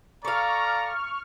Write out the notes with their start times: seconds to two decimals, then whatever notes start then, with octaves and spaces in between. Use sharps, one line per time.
0.25 A4 D5 F5 A#5 C#6 F6